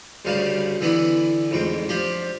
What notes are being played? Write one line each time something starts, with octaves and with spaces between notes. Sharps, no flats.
D2 G2 C#3 G3 F5 A5
D3 E3 B3 D4 E4
A1 F2 G#2 G5
F3 D4 G4 C5